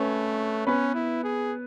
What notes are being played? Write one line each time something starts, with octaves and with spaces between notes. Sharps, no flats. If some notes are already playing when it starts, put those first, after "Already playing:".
Already playing: A3 C#4 B4 C#5
B3 C#4 B4
E4
G#4